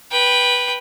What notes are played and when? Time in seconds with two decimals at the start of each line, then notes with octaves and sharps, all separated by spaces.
0.11 B4 G5